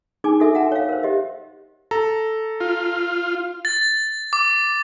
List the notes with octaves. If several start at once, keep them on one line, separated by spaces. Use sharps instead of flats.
D4 D#4 G#4 G#5 D6
D#4 F#4 A4 E5 G#5 E6
E5 F#5 G5 A#5
C#5 F5
A#4 C5
G4 D#5 E5
A4 A#5
F4
A6
D6